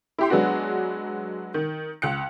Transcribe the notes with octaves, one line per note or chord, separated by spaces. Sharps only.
E4 G4 C6
F#3 G#3 B3 D4 F#4
D#3
C#2 F#6 C#7